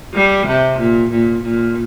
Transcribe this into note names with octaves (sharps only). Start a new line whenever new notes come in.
G3
C3
A#2
A#2
A#2